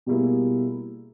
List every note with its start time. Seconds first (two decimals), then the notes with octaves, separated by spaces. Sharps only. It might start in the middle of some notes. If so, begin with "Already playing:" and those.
0.06 B2 G3 A#3 E4 G#4